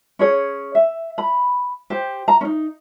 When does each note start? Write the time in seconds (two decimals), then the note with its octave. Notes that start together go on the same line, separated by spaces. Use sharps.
0.19 C#4 G#4 C#5
0.75 E5
1.18 B5
1.90 G4 C5
2.28 A#5
2.41 C#4 D#4